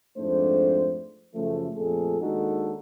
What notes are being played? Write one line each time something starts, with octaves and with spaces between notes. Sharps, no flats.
F2 G#2 A3 D4 C5
F#2 C#3 F3 A3
F2 A#2 A3 G#4 A4
D#2 G#3 D4 D#4 F#4 A4